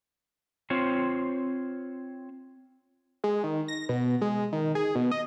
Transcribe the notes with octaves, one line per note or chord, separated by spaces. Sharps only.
C4 F4 C5 C#5
G#3
D#3
A#6
B2
G#3
D#3
G#4
B2
D#5